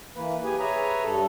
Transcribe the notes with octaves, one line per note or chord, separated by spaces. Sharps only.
E3 A#3 B4
G4 G#4 B4 G#5
G#4 B4 C#5 E5 G#5 A#5
G2 A4